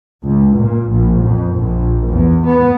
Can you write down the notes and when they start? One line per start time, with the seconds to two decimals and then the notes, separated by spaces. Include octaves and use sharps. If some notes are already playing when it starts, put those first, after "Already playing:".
0.24 C#2
0.57 A#2
0.91 A#1
1.24 F2
1.55 A#1
2.11 E2
2.47 B3